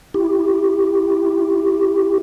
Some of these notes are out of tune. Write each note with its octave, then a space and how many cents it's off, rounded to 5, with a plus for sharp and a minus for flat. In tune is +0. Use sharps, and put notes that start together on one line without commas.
E4 +10 G4 +5